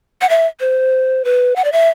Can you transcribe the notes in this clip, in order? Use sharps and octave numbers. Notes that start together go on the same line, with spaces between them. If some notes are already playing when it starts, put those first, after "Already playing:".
F#5
E5
C5
B4
F#5
D5
E5